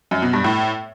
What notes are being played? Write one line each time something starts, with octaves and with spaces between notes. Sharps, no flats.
F#2
B2
G2
A2